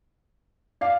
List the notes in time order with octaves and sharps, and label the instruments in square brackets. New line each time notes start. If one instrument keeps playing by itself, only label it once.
[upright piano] D5 F5